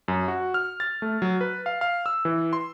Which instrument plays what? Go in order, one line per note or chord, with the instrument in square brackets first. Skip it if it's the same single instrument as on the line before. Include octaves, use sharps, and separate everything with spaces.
[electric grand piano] F#2
F#4
F6
A6
A3
F#3
B4
F5
F5
E6
E3
C6